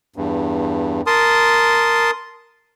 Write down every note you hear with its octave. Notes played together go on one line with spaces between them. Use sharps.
E2 G2
A#4 A5 C6 D#6